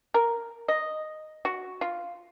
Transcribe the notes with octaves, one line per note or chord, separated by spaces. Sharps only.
A#4
D#5
F#4
F4